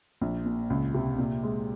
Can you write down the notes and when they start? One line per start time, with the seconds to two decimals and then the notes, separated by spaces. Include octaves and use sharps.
0.21 A#1
0.45 A#2
0.70 C#2
0.94 C3
1.18 A#2
1.43 G#3